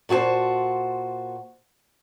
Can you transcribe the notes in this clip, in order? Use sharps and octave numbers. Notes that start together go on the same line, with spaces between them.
A#2 F#4 G#4 C5 A5